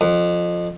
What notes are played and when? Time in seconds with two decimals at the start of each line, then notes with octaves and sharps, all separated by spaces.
0.01 F2